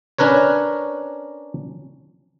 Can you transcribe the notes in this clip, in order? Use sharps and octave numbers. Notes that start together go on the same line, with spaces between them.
C#4 D4 A#4 B4 C#5